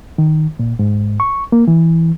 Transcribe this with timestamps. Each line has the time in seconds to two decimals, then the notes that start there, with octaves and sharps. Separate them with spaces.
0.18 D#3
0.59 A#2
0.79 G#2
1.20 C#6
1.52 A#3
1.68 E3